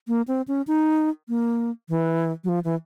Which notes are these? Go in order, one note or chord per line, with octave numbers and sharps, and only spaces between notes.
A#3
C4
C#4
D#4
A#3
E3
F#3
F3
E3